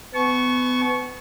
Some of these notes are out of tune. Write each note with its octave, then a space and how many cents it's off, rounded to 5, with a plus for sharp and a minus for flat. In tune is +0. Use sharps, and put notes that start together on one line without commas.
B3 +30 A5 -40 C#6 +0